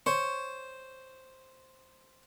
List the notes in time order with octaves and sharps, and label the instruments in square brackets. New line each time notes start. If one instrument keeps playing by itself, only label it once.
[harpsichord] C5 [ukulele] C#5